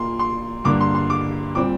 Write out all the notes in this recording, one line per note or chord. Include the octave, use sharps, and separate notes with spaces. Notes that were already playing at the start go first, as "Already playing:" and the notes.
Already playing: A#2 A#3 C6
C6
G2 D3 A#3 D6
C6
C6
D6
A#2 G3 C4 D6